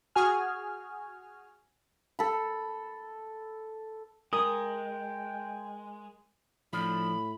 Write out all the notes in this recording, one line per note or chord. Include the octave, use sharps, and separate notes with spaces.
F#4 G#4 G#5 F6
A4 B5
G#3 A#4 G5 D#6
A2 F3 D4 B5